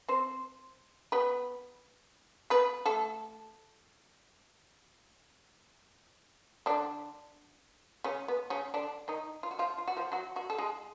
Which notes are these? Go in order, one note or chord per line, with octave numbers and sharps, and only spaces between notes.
C4 C5
B3 B4
B3 B4
A3 A4
D3 D4
C#3 C#4
B3
C#3 C#4
D3 D4
D#3 D#4
F4
F#4
F3 F4
F4
F#4
F3 F4
F#3 F#4
F#3 F#4
A4
G#3 G#4